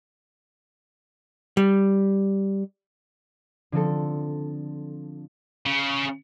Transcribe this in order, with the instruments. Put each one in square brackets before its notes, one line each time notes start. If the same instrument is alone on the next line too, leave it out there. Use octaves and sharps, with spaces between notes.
[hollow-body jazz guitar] G3
[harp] D3 F3 C4 A4
[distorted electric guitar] C#3